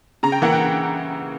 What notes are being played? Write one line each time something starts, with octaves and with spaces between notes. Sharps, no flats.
C#3 A#5
G5
E3 A#3 F#5
G5